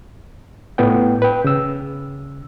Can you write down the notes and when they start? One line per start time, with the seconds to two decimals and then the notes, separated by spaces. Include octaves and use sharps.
0.78 A2 B3 G5
1.22 B4 G5
1.44 C#3 E6